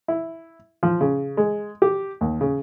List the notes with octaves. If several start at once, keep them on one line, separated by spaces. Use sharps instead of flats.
E4
F3
C#3
G#3
G4
D#2
C#3